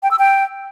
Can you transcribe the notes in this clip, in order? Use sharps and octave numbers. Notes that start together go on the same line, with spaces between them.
G5
E6
G5